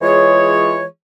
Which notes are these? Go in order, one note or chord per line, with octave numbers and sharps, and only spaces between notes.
E3 G#3 F4 G#4 C#5